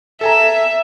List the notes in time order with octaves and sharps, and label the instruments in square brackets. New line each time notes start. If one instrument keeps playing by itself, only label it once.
[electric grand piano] A4 G#5 A#5 [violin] E5